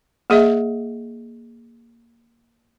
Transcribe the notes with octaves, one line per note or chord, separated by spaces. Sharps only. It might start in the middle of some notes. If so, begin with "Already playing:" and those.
A#3 G#4 D#5 E5